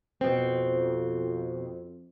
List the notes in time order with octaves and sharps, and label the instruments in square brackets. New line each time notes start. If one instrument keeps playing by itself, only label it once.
[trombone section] F2 [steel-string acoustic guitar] B2 C4